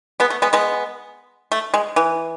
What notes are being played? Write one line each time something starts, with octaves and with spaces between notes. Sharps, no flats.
G#3 B3
A3
G#3 B3
G#3 B3
A3
G#3
E3